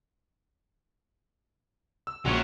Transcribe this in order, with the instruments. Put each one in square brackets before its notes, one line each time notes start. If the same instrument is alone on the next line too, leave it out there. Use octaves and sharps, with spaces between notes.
[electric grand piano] E6
[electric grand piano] A#1 [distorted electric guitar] F#3 C#4